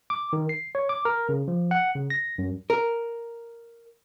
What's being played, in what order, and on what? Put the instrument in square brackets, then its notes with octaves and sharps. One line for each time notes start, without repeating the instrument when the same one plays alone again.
[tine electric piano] D6
D#3
C7
C#5
D6
A#4
C#3
F3
F#5
C#3
A#6
F#2
[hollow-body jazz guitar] A#4